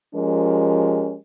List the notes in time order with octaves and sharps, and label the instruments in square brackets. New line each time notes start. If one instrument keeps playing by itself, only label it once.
[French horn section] F3 G#3 C#4 G4 A#4